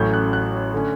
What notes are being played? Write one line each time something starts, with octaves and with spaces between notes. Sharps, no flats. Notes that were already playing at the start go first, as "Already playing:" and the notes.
Already playing: A1 A2 F#3 A3 C#4 G6
F#6
F#6
D3 A3 C#4